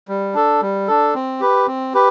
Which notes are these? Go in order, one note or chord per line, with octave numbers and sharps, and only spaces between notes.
G3
D4 A4
G3
D4 A4
C4
G4 B4
C4
G4 B4